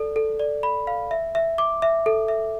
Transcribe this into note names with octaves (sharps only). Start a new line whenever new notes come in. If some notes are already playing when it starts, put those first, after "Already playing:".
Already playing: A4 D5
A4
D5
B5
F5
E5
E5
D6
E5
A4
E5